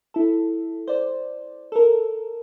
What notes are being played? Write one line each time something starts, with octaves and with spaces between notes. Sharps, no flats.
E4 A4
C5 D5
A4 A#4